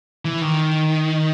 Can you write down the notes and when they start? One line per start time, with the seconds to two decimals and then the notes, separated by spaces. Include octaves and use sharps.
0.25 E3
0.42 D#3